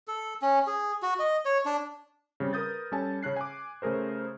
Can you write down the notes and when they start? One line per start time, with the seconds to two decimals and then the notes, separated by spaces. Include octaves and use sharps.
0.08 A4
0.42 C#4
0.67 G#4
1.02 F#4
1.19 D#5
1.45 C#5
1.66 D4
2.40 C#3 G3 C4
2.53 A#4 B4 D#6 G6 A6
2.92 G3 C#4 A4 G#5 A5
3.23 C#3 C#4 F#6 C7
3.36 G#5 D6
3.82 C#3 A3 G#4 A#4 C5